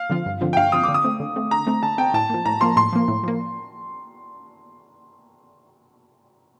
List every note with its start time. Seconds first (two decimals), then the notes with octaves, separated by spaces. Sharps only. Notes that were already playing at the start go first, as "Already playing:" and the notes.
Already playing: F5
0.10 D3 F3 C4 F4
0.26 G2
0.41 D3 F3 C4 F4
0.53 G5
0.57 G2 F5
0.72 D3 F3 C4 F4 D#6
0.83 D3 D6
0.94 D#6
1.04 A3 C4
1.20 D3
1.36 A3 C4
1.51 D3 A#5
1.67 A3 C4
1.83 D3 A5
1.98 A3 C4 G5
2.14 A2 A5
2.30 F3 A#3
2.45 A2 A#5
2.61 F3 A#3 C6
2.76 A2 C6
2.93 F3 A#3
3.08 A2
3.23 F3 A#3